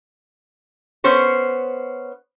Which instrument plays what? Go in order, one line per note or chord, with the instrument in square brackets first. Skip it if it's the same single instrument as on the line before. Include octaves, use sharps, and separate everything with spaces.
[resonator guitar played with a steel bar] B3 C#4 C5 C#5